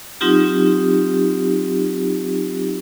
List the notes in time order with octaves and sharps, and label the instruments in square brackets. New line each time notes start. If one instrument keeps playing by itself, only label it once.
[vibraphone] F#3 C4 D#4 F4 G4